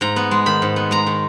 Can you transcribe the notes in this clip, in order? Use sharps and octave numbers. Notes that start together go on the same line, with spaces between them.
G#2 A#5
B3
G#3
D#3 B5
G#2
B3
G#3 A#5
D#3